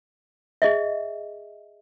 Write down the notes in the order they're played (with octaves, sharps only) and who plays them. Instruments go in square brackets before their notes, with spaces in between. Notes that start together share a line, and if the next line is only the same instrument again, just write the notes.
[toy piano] G#4 D#5 E5